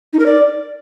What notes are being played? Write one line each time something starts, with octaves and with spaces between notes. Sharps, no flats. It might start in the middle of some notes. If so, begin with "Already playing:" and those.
D#4
A#4
D5